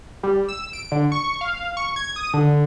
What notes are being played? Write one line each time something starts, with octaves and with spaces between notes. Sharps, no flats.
G3
E6
D7
D3
C#6
F5
C#6
G#6
D#6
D3